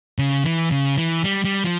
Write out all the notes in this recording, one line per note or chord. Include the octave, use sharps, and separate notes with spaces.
C#3
E3
C#3
E3
G3
G3
F3